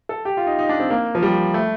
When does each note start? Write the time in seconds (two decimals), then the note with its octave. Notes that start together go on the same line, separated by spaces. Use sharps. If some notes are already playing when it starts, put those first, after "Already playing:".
0.09 A4
0.25 G4
0.37 F4
0.47 D#4
0.59 D#4
0.69 D4
0.80 C4
0.90 A#3
1.15 F3
1.23 G3
1.54 A3